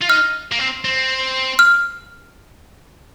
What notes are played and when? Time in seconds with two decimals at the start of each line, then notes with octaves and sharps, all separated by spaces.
0.02 F4
0.09 D#4 F6
0.52 A#3
0.59 C4
0.85 C4
1.59 F6